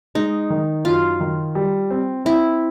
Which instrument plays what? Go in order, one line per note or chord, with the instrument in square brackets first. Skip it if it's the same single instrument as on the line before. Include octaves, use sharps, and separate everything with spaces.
[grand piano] G#3 [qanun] D#4
[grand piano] D#3
[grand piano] F#2 [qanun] F4
[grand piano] D#3
G3
C4
[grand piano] C4 [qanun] E4